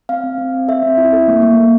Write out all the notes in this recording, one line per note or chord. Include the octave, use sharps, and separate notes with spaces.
C4 F5
C4
C4
C4
A4 E5
C4
E4
A4
A#3
A#3
A#3